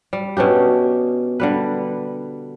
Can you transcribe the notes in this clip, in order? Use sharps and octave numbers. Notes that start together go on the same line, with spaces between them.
G3
B2 C#4 D4 G4
D3 G3 B4